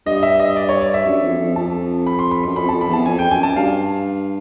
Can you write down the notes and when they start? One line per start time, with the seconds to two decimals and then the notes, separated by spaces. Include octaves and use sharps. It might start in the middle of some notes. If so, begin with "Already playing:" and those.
0.06 G2 D#5
0.23 E5
0.40 D#5
0.56 D5
0.69 C#5
0.81 D5
0.94 E5
1.06 F#2
1.23 F2
1.39 F2
1.56 F2 A5
2.06 B5
2.19 C6
2.31 B5
2.43 F#2 C6
2.56 F2 B5
2.69 F2 A5
2.81 B5
2.89 E2 A5
3.06 F2 G#5
3.19 G5
3.31 F#2 G#5
3.43 A5
3.55 G2 F5